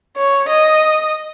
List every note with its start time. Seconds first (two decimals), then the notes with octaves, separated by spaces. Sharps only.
0.16 C#5
0.48 D#5